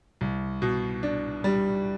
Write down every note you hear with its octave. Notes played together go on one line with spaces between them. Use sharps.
C2
B2
D4
G3